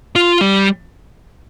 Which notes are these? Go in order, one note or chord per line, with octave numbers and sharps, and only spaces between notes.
F4
G3